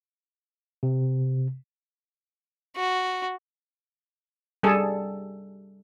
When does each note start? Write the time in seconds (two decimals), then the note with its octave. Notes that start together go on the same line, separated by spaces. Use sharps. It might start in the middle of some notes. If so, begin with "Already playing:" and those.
0.83 C3
2.76 F#4
4.63 G3 G#4 A4